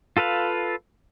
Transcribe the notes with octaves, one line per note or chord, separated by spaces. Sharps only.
F4 A4 B4 F5